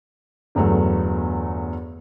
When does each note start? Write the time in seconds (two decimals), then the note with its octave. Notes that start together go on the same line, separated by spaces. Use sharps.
0.55 G1 E2 F#3 A3